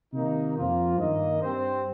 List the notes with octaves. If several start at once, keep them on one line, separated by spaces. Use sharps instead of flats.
C3 D#3 A#3 D#4
F2 F3 A#3 F4
G2 D#3 A#3 D#5
G2 G3 C4 C5